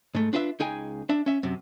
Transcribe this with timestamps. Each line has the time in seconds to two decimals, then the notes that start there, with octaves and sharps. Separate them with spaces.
0.15 G#2 A3
0.33 D4 F4 B4 D#5 E5
0.60 C#2 D#4 G#4 G5 G#5
1.09 D4 E5
1.26 C#4 E5
1.43 F#2 C3